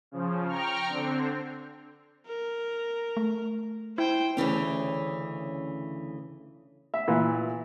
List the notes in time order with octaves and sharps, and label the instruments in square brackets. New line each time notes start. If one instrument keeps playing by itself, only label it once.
[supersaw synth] C#3 F3
G5 A#5 C#6 F6
D3 C4
[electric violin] A#4
[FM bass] A3
[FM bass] E4 [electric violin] C5 G5
[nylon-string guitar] D2 C#3 E3 C#4
[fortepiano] E5
A#2 E3